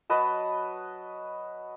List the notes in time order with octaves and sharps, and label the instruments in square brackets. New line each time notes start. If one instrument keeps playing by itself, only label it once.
[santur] F#3 B4 D#5 A5